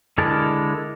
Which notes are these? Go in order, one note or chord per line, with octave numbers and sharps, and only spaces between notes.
D3 G#3 E4 A#4 A5